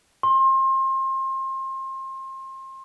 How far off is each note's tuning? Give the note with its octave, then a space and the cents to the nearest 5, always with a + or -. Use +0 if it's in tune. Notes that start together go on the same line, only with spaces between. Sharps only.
C6 +30